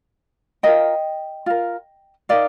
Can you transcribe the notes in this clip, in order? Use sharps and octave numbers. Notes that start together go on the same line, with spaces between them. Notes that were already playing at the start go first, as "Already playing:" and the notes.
F4 A#4 D#5 G5
F4 A#4
D#4 G4 A#4 D5 F5